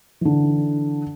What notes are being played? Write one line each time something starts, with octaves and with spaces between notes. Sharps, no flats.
D3 E3